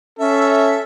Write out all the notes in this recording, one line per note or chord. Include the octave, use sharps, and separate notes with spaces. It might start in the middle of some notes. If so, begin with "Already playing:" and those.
C#4 A4 E5